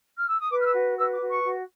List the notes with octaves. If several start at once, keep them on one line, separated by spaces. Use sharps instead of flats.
F6
E6
D#6
B4 D6
F6
E6
F#4
B4 E6
D6
F#4
C#6
F#4